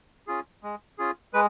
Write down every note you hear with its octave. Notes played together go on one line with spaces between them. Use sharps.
C#4 F4 G#4
G#3
C#4 F4 G#4
G#3 B4